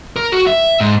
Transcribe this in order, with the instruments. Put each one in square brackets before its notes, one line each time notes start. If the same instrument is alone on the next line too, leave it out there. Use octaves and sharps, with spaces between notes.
[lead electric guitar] A#4
F#4
E5
G#2